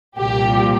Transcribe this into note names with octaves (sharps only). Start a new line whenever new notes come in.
C2 A#2 F3 G4